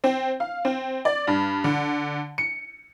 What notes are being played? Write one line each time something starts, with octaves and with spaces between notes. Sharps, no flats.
C4
F5
C4
D5
G2
D3
C#7